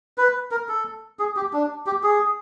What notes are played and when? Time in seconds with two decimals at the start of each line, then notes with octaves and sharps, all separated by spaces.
0.18 B4
0.51 A#4
0.69 A4
1.19 G#4
1.36 G4
1.53 D4
1.86 G4
2.03 G#4